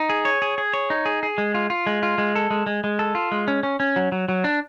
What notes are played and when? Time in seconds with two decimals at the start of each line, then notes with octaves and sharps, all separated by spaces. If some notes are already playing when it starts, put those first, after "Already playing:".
Already playing: D#4
0.10 G#4
0.25 C#5
0.42 G#4
0.58 G#4
0.73 C#5
0.90 D#4
1.06 G#4
1.23 G#4
1.38 G#3
1.54 F4
1.70 F4
1.87 G#3
2.03 F4
2.18 G#3
2.35 A4
2.50 G#3
2.66 G#3
2.84 G#3
2.99 A4
3.15 F4
3.32 G#3
3.48 C#4
3.63 C#4
3.80 C#4
3.96 F#3
4.12 F#3
4.29 F#3
4.44 D4